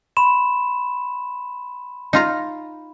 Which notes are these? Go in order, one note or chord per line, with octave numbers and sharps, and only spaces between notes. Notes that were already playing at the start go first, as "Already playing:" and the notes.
B5 C6 E7
D#4 F4 A#5